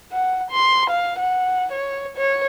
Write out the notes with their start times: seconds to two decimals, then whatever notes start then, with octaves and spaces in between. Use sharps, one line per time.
0.12 F#5
0.51 C6
0.90 F5
1.19 F#5
1.72 C#5
2.17 C#5